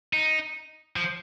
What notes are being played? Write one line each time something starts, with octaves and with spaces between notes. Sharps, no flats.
D#4
F3